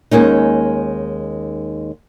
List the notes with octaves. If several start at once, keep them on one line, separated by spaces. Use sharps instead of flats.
D#2 G#3 A#3 C#4 D#4